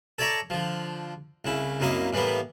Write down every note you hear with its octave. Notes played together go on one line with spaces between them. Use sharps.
A4 C#5 D5 E5 A#5 C#6
D3 F3
C2 C#3 E4
C2 F#2 A#3 E4 D#5 D#6
A2 E3 G3 A#3 B3